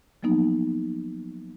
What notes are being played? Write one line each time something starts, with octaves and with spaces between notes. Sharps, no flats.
F3 F#3 A#3 B3 D#4